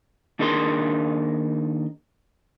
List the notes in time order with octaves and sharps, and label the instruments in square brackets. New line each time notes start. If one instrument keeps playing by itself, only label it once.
[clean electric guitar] D#2 D4 D#4 G#4 A#4 C6